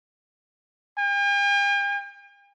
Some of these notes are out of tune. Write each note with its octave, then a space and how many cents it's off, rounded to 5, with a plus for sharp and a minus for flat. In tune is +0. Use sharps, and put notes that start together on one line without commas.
G5 +45